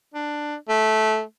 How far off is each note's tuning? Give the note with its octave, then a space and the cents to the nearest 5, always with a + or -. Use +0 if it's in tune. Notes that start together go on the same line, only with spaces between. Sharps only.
D4 +10
A3 -15